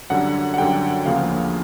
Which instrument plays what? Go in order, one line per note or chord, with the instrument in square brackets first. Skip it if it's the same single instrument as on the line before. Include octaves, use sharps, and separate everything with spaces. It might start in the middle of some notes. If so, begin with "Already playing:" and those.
[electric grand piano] F#2 D3 G3 F#5
F#5
F#2 D3 G3 G5
D2 C#3 F3 A#3 F5